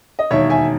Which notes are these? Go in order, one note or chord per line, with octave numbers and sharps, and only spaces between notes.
D#5
E1 D#2 D#3 C#5 E5
E5 G#5